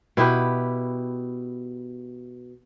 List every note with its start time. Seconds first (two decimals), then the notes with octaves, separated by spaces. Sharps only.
0.17 B2 E4 G4 B4